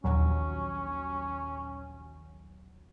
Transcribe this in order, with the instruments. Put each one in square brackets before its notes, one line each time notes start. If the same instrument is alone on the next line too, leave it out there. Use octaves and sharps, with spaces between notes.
[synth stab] A#1 D#2 F#3 [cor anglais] C#4